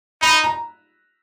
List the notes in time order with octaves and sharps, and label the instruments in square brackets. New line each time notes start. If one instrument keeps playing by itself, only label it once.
[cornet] D#4 [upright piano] B5
[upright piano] A#5